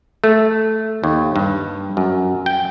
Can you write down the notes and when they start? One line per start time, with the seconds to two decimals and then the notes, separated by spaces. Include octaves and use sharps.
0.24 A3
1.04 D#2
1.36 G2
1.97 F#2
2.46 G5